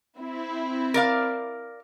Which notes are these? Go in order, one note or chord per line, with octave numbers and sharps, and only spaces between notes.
C4 E4
A#4 D5 F5